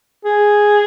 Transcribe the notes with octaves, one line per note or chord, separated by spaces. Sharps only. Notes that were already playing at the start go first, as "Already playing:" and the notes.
G#4